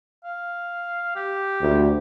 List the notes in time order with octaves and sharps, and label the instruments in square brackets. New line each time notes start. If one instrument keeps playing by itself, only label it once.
[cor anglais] F5
G4
[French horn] D2